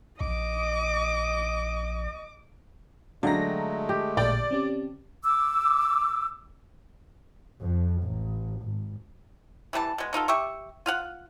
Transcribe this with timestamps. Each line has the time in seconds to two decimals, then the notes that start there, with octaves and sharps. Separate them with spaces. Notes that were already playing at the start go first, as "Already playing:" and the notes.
0.21 A#1 D#5 D6
3.23 D3 F#3 G#3 A3 F5 G5 A#5 A#6
3.89 G4
4.17 A1 A#2 D5 G5
4.51 C4 C#4 G4
5.24 D6 E6
7.60 F2
8.03 A1
8.62 G#1
9.73 E3 G3 B4 A5
9.98 B2 G#3
10.13 B2 D#4 F4 A4
10.28 G4 E5 C#6
10.86 F4 F5 F#5